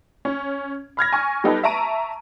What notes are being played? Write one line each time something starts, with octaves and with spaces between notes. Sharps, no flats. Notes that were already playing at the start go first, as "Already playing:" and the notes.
C#4
B5 F6 G#6 A#6
G#5 C#6
G3 B3 D#4 G4 A4 B4
E5 A5 A#5 C#6 D7 D#7